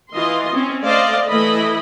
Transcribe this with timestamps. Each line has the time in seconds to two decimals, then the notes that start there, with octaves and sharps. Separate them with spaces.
0.13 E3 F4 D#5 C6
0.53 C4 C#4
0.85 A3 C5 D5 D#5 F5
1.28 E3 A3 E4 D#5 B5